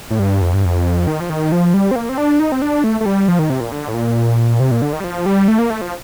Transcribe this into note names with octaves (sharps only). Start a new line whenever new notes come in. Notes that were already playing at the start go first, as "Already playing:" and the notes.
A2
G2
F2
G2
F2
D#3
F3
D#3
F3
G3
C4
A#3
C4
D4
D#4
C4
D4
A3
A3
G3
F3
D#3
C3
A#2
D3
A2
A#2
C3
A#2
D3
D#3
G3
F3
G3
A3
A#3
A3
F3